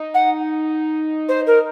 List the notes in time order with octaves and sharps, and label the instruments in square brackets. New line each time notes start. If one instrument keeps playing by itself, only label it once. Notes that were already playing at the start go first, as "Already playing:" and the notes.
Already playing: [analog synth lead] D#4
[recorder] F#5
C5
A#4